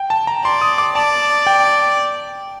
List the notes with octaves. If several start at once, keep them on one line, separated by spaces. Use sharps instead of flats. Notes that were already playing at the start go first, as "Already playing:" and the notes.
Already playing: G5
A5
A#5
D5 C6
D#6
D6
D5 A5
G5